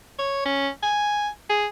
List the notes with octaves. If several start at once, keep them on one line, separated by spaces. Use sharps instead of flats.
C#5
C#4
G#5
G#4